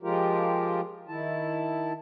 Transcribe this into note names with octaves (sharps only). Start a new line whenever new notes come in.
F3 G#3 F4 G4 A#4
D#3 E4 A5